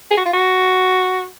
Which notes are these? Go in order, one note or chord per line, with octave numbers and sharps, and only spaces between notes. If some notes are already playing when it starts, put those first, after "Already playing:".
G#4
F#4
F4
F#4